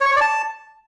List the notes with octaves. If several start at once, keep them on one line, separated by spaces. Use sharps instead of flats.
C#5
C#6
C#5
D5
A5